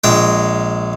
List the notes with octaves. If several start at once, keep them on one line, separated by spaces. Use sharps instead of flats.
A#1 G#3 G5